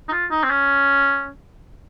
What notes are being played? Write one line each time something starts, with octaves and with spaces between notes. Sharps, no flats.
D#4
F4
D#4
C4
C#4